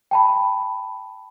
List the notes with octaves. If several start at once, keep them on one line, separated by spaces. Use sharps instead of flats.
G5 A5 B5